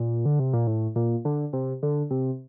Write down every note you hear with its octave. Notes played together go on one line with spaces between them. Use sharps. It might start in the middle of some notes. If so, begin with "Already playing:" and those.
Already playing: A#2
D3
C3
A#2
A2
A#2
D3
C3
D3
C3